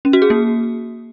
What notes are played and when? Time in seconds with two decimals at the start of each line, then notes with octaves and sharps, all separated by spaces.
0.05 C#4
0.13 F#4
0.22 G#4
0.30 A#3